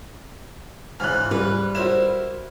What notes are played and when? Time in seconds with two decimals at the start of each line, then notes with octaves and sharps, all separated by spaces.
1.00 C#2 G#2 E3 F6 F#6
1.31 G3 B4
1.75 E4 F#4 A#4 C5 E7